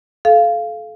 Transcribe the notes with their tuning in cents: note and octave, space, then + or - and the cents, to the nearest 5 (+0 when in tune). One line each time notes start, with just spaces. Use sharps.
A4 -30 F5 -10